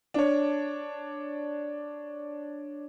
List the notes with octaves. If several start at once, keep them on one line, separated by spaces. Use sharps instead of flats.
D4 C#5